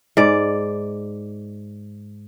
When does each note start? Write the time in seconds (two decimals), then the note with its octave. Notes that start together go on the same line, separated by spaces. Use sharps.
0.17 G#2 D5